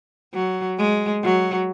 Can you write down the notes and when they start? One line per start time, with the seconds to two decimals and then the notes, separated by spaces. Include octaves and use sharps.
0.34 F#3
0.78 G#3
1.23 F#3